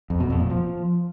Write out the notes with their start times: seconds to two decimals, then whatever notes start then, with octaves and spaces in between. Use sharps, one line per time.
0.10 F2
0.20 B2
0.30 F2
0.40 A#2
0.50 F3